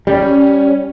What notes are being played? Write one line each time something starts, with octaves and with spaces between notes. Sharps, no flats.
G3 C#4